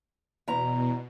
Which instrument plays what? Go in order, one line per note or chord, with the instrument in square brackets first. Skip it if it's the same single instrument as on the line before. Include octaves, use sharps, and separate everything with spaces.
[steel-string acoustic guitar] E2 E4 A#5 [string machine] B2